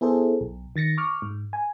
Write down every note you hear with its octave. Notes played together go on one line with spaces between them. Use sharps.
B3 E4 G#4 A4 C5
B1
D#3 A6 A#6 C#7
C#6 D6 F6
G#2
G#5